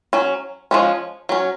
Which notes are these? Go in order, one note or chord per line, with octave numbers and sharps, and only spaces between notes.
F#3 C#4
F3 G#3 C#4
F#3 C#4